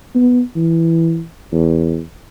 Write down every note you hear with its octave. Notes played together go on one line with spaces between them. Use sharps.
B3
E3
E2